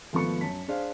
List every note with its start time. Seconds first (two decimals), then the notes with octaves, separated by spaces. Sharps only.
0.13 G#1 F3 A3 B3 C#6 C#7
0.41 F#2 A5 B6
0.68 D4 G#4 C5 F5